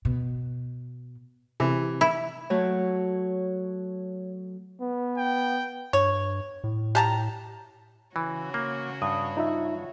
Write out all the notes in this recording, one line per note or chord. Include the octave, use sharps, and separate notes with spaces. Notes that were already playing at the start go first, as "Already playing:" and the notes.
B2
C3 E3
E4
F#3 A3 C#5
B3
G5
G2 C#5
A2
G4 A5 A#5
C#3 E3 F#4 C#5
A#3
G2 D#6
D#4 F4 E5